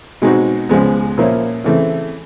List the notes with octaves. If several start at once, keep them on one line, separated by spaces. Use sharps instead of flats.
B2 G#3 C4 D#4 F#4
C#2 C#3 F3 G#3 B3
A#2 F3 A#3 C#4 E4
C#3 E3 A3 C4